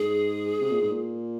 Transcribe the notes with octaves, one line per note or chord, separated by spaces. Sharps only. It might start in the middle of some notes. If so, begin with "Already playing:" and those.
Already playing: G#2 G#4
C3
A#2
G#2
A#2